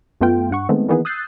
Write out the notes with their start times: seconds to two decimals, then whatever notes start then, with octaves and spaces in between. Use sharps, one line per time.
0.21 F#2 A3 B3 F4 G5
0.51 G2 F#5 C#6
0.69 D#3 G#3 A3 B3 C4
0.88 D#3 E3 A#3 B3 D#4 G#4
1.05 D#6 E6 F#6 G6 A6 C7